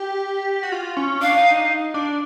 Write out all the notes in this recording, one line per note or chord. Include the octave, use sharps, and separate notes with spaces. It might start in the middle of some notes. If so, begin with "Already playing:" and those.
Already playing: G4
F#4
F4
C#4
D4 F5
D#4
D#4
D4